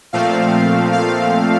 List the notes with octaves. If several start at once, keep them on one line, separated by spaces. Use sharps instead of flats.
A#2 F3 A3 C4 F5
F5